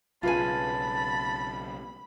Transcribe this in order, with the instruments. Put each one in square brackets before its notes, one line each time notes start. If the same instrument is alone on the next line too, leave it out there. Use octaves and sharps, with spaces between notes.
[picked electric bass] B1 C#3 [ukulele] F4 B4 G#5 [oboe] A5 [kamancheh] B5